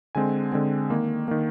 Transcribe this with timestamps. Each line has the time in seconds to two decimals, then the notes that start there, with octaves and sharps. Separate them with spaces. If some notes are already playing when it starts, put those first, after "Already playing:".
0.15 D3 G#3 C4 G#5
0.52 D3 G#3 C4
0.90 D#3 A#3
1.28 D#3 A#3